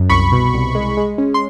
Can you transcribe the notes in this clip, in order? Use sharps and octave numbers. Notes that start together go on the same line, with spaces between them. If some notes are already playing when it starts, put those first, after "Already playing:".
Already playing: F#2
C2 B5 C#6
B2
C2
G#3
G#3
C#4
C6